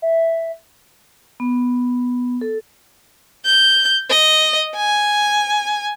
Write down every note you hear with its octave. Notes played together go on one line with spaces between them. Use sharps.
E5
B3
A4
G6
D#5
G#5